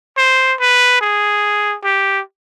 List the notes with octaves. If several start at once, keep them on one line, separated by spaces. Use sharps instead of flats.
C5
B4
G#4
G4